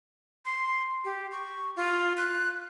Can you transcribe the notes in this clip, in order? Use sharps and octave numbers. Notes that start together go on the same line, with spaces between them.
C6
G4
C#6
F4
F#6